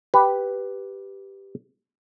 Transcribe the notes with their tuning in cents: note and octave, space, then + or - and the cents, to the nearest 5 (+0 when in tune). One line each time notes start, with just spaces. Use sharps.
G4 +0 B4 +0